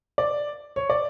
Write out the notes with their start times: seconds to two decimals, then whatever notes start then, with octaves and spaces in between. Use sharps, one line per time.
0.18 D5
0.76 C#5
0.90 D5